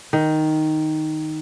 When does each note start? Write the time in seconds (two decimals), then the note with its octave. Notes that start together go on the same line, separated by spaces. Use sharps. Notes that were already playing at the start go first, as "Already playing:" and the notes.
0.13 D#3